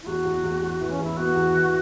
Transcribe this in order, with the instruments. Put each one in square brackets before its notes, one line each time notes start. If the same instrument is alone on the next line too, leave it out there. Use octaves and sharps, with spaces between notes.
[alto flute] E4
[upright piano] E2 [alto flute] F#4
[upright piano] E2
E2
E2
E3
[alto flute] C#4
[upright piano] E2 [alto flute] E4
[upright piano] B3 [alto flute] F#4
[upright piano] E2
E3